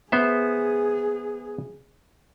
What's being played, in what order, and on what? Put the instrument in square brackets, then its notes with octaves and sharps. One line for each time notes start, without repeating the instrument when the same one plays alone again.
[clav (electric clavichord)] B3 C5 E5 [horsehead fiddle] G#4